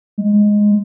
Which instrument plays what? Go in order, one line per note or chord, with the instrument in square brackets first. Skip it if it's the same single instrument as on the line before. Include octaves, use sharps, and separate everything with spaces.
[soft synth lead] G#3